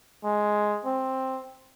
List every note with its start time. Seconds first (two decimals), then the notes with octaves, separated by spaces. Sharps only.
0.24 G#3
0.85 C4